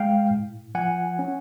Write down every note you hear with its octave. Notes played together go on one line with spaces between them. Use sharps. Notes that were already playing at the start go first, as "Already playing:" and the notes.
Already playing: G#3 F5 G5
A2
F3 F#5 G#5
C#4